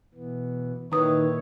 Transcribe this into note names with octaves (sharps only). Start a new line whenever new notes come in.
B2 E3 B3
A#2 D#3 E4 B4 C#5 A#5 D#6